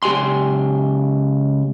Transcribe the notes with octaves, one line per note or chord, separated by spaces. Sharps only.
C#2 G4 G#5 C6